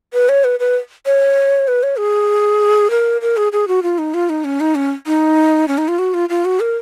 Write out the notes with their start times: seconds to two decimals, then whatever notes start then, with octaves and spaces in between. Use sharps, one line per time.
0.13 B4
0.29 C#5
0.44 B4
0.60 B4
1.06 C#5
1.68 B4
1.83 C#5
1.98 G#4
2.90 A#4
3.21 A#4
3.37 G#4
3.52 G#4
3.68 F#4
3.83 F4
3.98 D#4
4.14 F4
4.29 D#4
4.44 C#4
4.60 D#4
4.75 C#4
5.06 D#4
5.68 C#4
5.78 D#4
5.88 F4
5.99 F#4
6.14 F4
6.29 F4
6.45 F#4
6.60 A#4